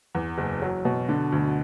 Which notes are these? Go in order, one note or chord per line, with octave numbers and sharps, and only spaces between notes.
E2
F#1
F#3
B2
D3
D2